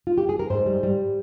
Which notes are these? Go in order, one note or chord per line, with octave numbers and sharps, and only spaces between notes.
F4
G4
G#4
A#4
G#2 C5
G3
G3